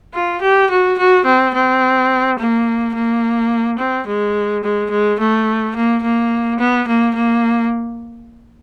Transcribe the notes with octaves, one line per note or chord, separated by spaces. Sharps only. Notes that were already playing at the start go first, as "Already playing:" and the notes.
F4
G4
F#4
F#4
C4
C4
A#3
A#3
C4
G#3
G#3
G#3
A3
A#3
A#3
B3
A#3
A#3